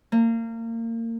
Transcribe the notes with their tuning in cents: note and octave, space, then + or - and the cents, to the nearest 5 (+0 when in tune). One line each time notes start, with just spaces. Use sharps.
A#3 -30